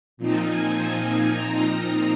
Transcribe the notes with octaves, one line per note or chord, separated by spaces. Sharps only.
A#2 F3 C4 D#4
G#5
A#2 F3 C4 D#4 A#5